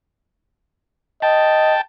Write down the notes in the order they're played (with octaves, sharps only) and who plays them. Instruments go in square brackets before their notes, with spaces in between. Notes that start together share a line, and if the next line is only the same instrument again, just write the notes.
[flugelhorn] D#5 [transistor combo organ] G5 A5